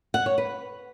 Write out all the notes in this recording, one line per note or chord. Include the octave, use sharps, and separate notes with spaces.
F#5
C#5
B4